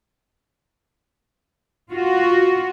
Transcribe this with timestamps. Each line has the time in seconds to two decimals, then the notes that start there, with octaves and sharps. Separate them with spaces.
1.91 F4 F#4